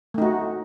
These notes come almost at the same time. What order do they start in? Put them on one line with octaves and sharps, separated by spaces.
A3 D#4 F#4